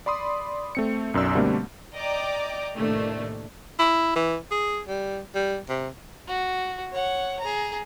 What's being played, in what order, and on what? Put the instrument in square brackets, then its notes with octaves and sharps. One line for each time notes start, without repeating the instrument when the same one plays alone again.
[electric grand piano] D5 B5 C6 D#6
A3 C4 C#7
B1 F#2 D5 E6
B2 D3 G3 A3 A#3 C4
[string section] D5 D#5 G5 A#5 D6
A2 C3 D#3 A3 A#3 D4
[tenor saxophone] E4
E3
G#4
G3
G3
C3
[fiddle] F#4
C#5 F#5
G#4 A#5